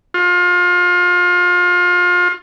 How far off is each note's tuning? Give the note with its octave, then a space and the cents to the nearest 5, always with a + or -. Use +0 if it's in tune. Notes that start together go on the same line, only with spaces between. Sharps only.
F4 +30